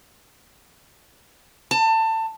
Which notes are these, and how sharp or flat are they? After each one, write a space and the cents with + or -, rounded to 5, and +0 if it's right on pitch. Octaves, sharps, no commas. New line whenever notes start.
A5 +25